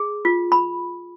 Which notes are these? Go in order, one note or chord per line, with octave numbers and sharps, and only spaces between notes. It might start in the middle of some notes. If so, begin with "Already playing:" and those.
Already playing: G#4
F4
B5